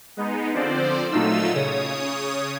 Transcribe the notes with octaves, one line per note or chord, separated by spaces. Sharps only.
G#3 B3 D#4
D3 F3 C4 C5 D5
A#2 F#3 A3 D#4 F4 E6
C#3 C#5 D#6